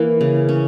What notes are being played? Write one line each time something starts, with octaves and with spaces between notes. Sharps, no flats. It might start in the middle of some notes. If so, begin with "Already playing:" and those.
Already playing: E3 A#3
C#3
C#4